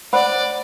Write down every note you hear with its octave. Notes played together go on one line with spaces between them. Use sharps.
C5 D5 F#5 B5